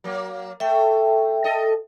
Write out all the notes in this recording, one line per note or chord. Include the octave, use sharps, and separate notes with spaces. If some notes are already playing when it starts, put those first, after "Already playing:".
F#3 A#3
A3 E5 G5
A4 D#5